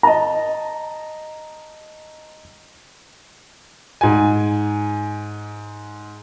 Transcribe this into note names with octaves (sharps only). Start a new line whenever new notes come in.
D#5 A5 A#5
G#2 G#5